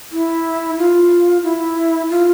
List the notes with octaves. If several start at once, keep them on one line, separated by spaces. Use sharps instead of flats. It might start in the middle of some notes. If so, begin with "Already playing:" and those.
E4
F4
E4
F4